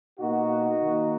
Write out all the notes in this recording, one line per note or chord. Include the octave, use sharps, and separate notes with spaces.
B2 A#3 D#4 F#4
D#3 A#3